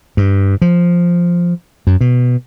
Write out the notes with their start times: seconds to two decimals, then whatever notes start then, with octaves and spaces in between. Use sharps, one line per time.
0.17 G2
0.62 F3
1.87 F#2
2.01 B2